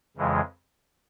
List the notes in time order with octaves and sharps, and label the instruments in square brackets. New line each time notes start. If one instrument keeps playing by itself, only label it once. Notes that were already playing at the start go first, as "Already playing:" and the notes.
[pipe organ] F2 C#3 E3 G#3